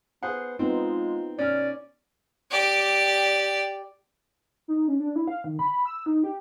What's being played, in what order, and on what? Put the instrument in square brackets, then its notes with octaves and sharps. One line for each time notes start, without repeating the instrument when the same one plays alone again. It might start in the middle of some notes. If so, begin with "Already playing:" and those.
[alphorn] B3 [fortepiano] G#4 C5 F#5
[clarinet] G#3 [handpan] B3 D#4 [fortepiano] C4 [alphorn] F4
[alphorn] B2 [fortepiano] C#4 F6 [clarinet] D5
[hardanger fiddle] G4 D5
[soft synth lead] D#4
C#4
D4
E4
F5
D#3
B5
E6
D#4
G4